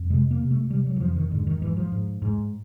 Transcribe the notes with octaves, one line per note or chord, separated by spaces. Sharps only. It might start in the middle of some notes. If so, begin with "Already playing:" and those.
Already playing: F2
C3 G#3
A#3
C3
A3
C3 G3
F#3
E3
F2 F3
D#3
G#2 D3
D#3
G#2 E3
F3
G#2
G#2